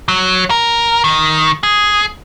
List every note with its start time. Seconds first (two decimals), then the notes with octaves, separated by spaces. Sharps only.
0.08 F#3
0.50 A#4
1.04 D#3
1.63 G#4